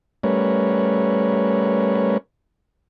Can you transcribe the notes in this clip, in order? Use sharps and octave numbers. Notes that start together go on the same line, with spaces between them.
G3 A3 C#4 A#4 B4 C#5